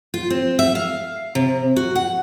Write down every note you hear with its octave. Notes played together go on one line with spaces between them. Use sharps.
F4
C4
E5
F5
C3
F#4
F#5